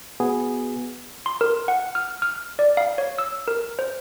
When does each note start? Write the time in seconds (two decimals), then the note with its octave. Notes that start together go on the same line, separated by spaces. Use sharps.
0.20 B3 F#4 G#4
1.26 C6
1.41 A#4
1.68 F#5
1.95 F6
2.22 F6
2.59 D5
2.77 F5
2.98 C#5
3.18 E6
3.48 A#4
3.79 C5